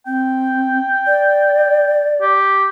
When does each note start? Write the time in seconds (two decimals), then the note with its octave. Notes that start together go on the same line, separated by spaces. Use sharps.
0.07 C4 G5
1.07 D5
2.22 G4